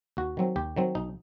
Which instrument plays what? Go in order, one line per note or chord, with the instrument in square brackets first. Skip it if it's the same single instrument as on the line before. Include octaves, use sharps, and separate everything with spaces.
[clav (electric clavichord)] D#2 F#4
D#3 F#3 C4
D#2 G4
D#3 F#3 C4
B1 D#4